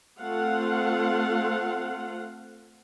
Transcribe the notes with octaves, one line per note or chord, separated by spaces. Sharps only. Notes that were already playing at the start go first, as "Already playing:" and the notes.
A3 C4 F4 F5 F#5